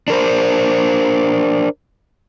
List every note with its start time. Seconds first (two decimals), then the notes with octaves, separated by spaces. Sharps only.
0.08 D4 A#4 C5